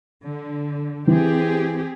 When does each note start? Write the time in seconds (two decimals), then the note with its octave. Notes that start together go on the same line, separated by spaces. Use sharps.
0.21 D3
1.07 E3 C4 G4 G#4